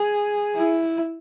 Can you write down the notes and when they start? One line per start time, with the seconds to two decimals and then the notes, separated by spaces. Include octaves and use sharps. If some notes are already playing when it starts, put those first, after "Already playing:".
Already playing: G#4
0.55 E4